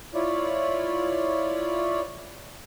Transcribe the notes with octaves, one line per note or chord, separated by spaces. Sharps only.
E4 F4 C#5 D5